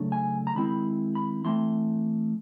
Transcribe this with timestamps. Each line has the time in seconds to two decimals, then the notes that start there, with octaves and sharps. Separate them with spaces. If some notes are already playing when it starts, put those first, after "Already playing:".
Already playing: C#3 F#3 A3 D4
0.12 G#5
0.47 A#5
0.56 D#3 G#3 C4 E4 B5
1.15 B5
1.45 E3 A3 C4 C6